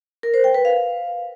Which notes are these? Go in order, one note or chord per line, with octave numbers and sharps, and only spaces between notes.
A#4
C5
G5
B4
F5